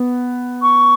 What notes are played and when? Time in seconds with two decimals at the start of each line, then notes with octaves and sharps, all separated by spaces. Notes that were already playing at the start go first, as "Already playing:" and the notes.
Already playing: B3
0.62 C#6